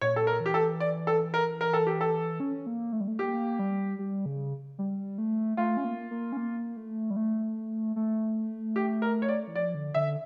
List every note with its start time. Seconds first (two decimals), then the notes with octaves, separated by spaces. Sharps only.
0.01 A#2 C#5
0.16 A4
0.27 A#4
0.41 E3
0.46 G4
0.54 A4
0.80 D5
1.07 A4
1.34 A#4
1.61 A#4
1.73 A4
1.87 G4
2.01 A4
2.40 C#4
2.66 A#3
2.93 A3
3.01 G3
3.08 A3
3.19 A#3 G4
3.59 G3
3.99 G3
4.26 C#3
4.78 G3
5.18 A3
5.57 A3 F4
5.77 C#4
5.85 A#3
6.11 A#3
6.32 C#4
6.37 A#3
6.77 A3
7.10 G3
7.16 A3
7.96 A3
8.76 G4
9.02 A#4
9.22 C#5
9.29 D5
9.48 E3
9.55 F3 D5
9.75 D3
9.94 D3 E5